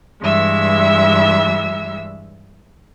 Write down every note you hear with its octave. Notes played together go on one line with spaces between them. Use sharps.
G2 E3 G#3 E5 E6